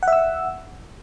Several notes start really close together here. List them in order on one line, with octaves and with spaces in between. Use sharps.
F#5 E5 E6